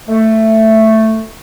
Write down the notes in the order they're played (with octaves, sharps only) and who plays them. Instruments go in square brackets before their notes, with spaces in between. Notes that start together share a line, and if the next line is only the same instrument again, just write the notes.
[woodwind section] A3